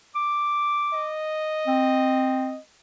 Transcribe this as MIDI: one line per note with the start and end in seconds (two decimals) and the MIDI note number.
0.15 1.12 86
0.94 2.61 75
1.67 2.55 60